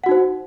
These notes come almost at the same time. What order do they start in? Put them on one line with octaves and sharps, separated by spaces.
F#5 F#4 D#4 C5